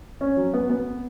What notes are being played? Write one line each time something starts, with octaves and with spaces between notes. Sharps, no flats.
C#4
F#3
B3
B3